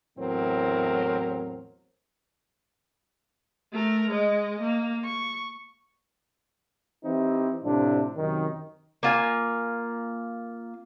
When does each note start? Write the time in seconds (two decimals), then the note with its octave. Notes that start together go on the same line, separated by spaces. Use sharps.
0.18 E2 A2 F#3 C4 A#4
3.72 A3 A#4
4.09 G#3 D#5
4.61 A#3
5.05 C#6
7.05 E3 C4 D#4 E4 G4
7.64 A2 C3 F3 D4
8.17 F#2 C3 D#3
9.03 A#3 F4 G#5